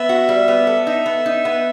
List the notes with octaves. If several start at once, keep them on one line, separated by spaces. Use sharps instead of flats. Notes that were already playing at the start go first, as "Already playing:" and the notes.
Already playing: B3 E5
F#4
G3
B3
A4
D#4 E5
B3
D#4
B3